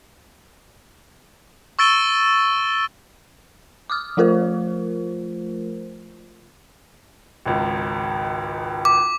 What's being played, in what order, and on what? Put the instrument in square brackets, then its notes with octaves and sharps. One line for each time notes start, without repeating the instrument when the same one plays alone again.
[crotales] C#6 E6 A6 D7 D#7 G7
[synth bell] D6 D#6 F6
F3 A3 F4 A#4 C5
[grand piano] G#1 C#2
[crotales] D6